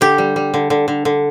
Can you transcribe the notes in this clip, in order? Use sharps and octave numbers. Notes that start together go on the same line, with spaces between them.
D3 G4
G3
G3
D3
D3
D3
D3